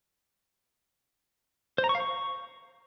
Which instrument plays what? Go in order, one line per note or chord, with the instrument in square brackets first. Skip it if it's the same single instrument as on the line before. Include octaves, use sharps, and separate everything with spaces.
[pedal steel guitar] C5
A#5
C#6
F5
C#6